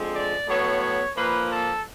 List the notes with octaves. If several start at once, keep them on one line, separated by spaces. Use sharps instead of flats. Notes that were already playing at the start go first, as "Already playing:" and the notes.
Already playing: D3 F3 G#3 C4
D5
A2 F#3 B3 C#5
C#5
A#2 F3 A#3 B4
A4